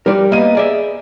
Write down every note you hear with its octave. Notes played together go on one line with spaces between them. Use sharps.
G3 A#4 D5
A#3 B3 D#5 D#7
G#4 D5 E5